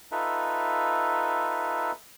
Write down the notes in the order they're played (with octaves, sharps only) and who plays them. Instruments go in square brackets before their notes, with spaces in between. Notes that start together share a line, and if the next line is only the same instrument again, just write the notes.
[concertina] D#4 F4 A4 B4 E5